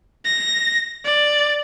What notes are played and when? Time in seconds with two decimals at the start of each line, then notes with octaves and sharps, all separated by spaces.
0.25 A#6
1.05 D5